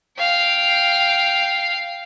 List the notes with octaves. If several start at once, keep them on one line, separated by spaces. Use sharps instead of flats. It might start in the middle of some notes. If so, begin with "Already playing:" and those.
F5 G5